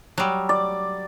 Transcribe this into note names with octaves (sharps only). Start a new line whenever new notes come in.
F#3 G3
D5